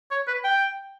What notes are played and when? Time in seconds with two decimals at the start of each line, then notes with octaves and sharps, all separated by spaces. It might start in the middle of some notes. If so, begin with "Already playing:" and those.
0.11 C#5
0.28 B4
0.44 G5